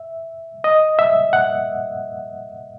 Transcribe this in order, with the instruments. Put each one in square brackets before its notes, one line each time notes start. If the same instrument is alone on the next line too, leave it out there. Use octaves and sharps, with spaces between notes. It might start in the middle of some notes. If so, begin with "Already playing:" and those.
Already playing: [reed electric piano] E5
D#5
E5
F#5